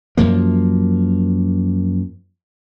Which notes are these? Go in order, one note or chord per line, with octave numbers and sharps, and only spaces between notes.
F#2 F3 A#3